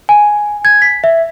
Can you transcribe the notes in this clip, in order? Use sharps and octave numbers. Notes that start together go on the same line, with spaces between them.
G#5
G#6
B6
E5